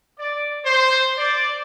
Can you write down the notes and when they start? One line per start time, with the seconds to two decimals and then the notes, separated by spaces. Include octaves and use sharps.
0.19 D5
0.65 C5
1.18 D5